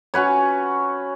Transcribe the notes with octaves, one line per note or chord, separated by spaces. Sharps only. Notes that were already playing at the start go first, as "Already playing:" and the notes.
C#4 F#4 B4 C#5